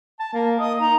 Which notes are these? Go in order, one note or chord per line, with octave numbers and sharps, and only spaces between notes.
A5
A#3
D#5 D#6
D#4 A#5